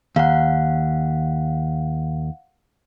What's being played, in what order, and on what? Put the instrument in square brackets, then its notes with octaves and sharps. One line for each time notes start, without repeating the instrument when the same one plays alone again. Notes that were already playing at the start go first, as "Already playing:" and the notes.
[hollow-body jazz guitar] D#2 [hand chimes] F5 F#5